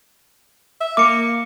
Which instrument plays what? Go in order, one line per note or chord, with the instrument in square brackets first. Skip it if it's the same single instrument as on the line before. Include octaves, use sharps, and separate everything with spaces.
[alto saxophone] E5
[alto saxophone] A#3 [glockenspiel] D6 C#7